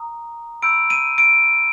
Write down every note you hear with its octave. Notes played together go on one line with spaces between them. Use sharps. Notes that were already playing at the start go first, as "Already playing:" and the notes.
Already playing: A#5 D#6
B5 E6 G6 D7
D#7
D7